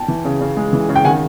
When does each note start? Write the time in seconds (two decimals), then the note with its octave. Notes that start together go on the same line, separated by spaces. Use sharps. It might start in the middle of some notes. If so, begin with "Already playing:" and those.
Already playing: G5 A5
0.08 E3
0.25 C#3
0.41 C#3
0.57 G#3
0.73 E3
0.89 C#3
0.96 G5
1.05 D#3 F#5 G#5